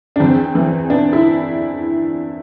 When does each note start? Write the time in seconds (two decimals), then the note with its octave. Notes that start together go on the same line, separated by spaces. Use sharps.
0.16 D4
0.20 E2 C4
0.55 E3
0.90 B3 D4
1.13 E4